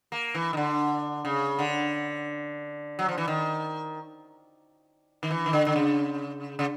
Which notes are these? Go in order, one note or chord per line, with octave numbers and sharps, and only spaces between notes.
A#3
E3
D#3
D3
C#3
D3
F#3
F3
E3
D#3
D#3
E3
D#3
D3
D3
C#3
C#3